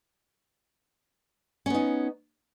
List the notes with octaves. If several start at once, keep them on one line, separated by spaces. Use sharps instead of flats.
B3 C#4 D#4